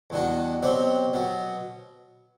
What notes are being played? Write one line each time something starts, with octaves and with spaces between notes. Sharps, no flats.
E2 B2 G3 D4 F#4
B2 F#3 C4 G4 D5
B2 F#3 B3